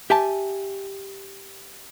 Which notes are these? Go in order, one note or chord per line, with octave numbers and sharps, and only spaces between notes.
G4 E5 G#5 A5